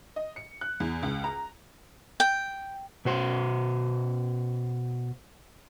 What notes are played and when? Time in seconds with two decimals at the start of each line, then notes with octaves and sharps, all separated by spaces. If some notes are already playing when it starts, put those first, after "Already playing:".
0.16 D#5
0.36 C#7
0.61 F#6
0.80 E2
1.03 C#2
1.24 A#5
2.20 G5
3.05 B2 F#4 C5